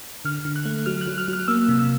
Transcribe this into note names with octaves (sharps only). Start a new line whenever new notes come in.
D3 F6
D3
F#6
A3
F#3 F6
F#6
F#3
F6
F#3
F6
A#3 E6
C3
E6